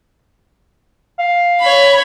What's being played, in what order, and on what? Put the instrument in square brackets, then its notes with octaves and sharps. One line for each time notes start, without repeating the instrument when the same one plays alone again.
[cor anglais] F5
[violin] C#5 B5